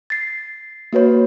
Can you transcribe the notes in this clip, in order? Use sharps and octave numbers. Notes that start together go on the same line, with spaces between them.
A6 C7
A#3 F#4 B4 C#5